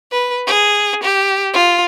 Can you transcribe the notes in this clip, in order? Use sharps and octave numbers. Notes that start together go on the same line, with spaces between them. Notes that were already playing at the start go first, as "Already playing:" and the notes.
B4
G#4
G4
F4